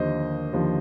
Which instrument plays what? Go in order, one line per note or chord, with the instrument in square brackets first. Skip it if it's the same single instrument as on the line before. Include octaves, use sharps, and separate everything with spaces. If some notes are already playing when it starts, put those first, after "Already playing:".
Already playing: [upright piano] D#2 D3 F3 C5 D#5
D#2 D3 F3